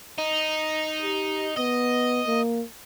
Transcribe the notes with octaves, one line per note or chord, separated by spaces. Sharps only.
D#4
G4
B3 D#5
A#3